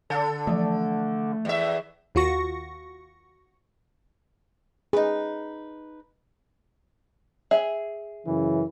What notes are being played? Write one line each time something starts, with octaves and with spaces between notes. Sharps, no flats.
D3 A4
E3 F3 A3
E2 E5
D#2 F4 F#4 C#6 A#6
D#4 G#4 B4
G#4 E5
F#2 C#3 E3